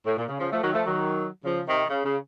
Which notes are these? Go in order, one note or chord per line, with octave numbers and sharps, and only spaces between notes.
A2
A#2
C#3
C#3 F3
F3 A3
D#3 F#3
F3 A3
D#3 F#3
C#3 F3
C3 D#3
C#3
C#3